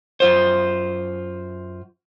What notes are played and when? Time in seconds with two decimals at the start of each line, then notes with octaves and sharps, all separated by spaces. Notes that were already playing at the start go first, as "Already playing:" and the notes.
0.20 F#2 F4 C5